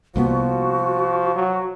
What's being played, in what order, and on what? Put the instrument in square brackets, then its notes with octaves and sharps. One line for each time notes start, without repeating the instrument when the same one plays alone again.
[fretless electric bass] C2 A#3 B3 [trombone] F3 [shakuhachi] F#4
[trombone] F#3